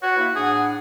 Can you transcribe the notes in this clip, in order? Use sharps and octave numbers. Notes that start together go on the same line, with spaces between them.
F#4 B4 C#5 F#5
A#3 E4
A2 D4 G#4 F#5